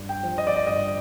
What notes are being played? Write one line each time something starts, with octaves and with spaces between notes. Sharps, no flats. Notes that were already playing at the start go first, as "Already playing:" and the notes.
Already playing: G2
G5
F3
D#5
D5
D#5
G2 D#5